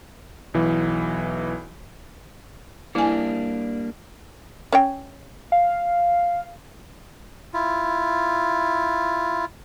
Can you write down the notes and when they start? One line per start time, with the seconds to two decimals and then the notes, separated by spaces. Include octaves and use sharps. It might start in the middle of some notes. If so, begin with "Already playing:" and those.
0.54 B1 E3
2.95 G3 A#3 D4 E4 G#5
4.72 C#4 C#5 G5
5.52 F5
7.54 E4 F4